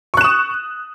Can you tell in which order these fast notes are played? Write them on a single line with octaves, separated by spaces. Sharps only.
C#6 F#6 E7 D#6